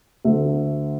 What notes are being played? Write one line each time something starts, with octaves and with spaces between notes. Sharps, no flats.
D2 D3 E5